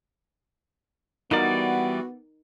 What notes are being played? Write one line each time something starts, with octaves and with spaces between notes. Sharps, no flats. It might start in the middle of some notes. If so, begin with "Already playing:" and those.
E3 G3 B3 D#4 F#4 A#4 D5